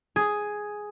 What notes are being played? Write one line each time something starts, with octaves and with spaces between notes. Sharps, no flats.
G#4